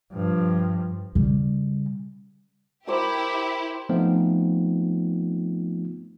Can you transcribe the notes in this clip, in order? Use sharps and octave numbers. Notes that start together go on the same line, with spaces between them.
G2 F3
C#3 G3
E4 G4 A#4 C5 D6
F3 A3 B3 C4 D#4 F4